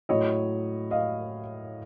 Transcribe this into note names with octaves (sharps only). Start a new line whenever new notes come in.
A2 F#3 C#5 D#5
D#5 F5